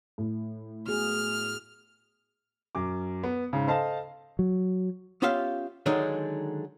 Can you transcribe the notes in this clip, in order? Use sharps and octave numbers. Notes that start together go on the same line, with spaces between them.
A2
B3 F#4 G#4 F6
F#2 D6
B3
G#2 C#3
A4 C5 D#5 F5 A5
F#3
B3 C#4 F4 G4 E5 F5
D3 D#3 F#3 G#3 D4 D#4